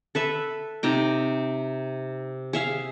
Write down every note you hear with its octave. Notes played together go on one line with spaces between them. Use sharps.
A4 B4 E5
C3 D#4 G5
G#4 E5 F5